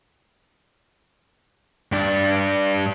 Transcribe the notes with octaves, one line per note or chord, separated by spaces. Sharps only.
G2 D4